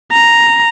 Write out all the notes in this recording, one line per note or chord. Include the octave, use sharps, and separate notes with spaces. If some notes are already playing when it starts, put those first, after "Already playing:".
A#5